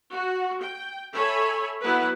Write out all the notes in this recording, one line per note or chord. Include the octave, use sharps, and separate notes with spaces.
F#4
G5
A4 C#5 E5 G#5 B5
F#3 B3 E4 B4